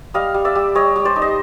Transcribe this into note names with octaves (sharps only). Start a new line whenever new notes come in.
G3 D#5 F5
G3
D5 E5
G3
G3 C#5 D#5
G3
C5 D5
D#4
D#5